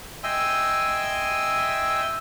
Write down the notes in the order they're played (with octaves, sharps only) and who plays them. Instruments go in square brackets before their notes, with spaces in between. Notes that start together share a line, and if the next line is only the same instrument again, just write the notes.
[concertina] D#5 E5 G5 G#5 C6 E6